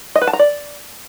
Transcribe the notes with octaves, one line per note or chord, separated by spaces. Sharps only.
D#5
B4
A5
A#5
D5